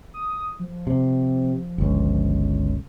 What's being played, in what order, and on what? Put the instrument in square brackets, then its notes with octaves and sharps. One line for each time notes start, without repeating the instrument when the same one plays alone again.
[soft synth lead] D#6
F3
[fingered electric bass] C3
G1 C#2